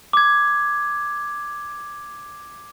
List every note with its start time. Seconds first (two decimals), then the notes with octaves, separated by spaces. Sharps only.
0.13 D6 G#6